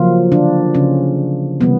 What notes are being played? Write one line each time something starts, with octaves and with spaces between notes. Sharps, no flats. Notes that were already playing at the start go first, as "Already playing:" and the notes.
Already playing: C#3 F3 F#3 A#3 F4
D3 D4
C#3 C#4
C3 E3 G3 A#3 B3